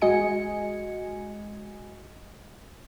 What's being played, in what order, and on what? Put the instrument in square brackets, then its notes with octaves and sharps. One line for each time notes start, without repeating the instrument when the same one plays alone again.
[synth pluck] A1 G#3 F#4 D#5 G#5 C#7